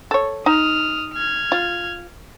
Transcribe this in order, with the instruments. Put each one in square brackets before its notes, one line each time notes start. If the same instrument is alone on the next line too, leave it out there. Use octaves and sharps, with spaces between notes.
[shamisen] A4 C#5
[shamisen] D#4 [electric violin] D#6 F6
[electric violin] F6 G#6
[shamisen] F4